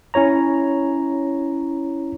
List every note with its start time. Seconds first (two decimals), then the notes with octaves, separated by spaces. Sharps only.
0.14 C#4 E4 C#5 A#5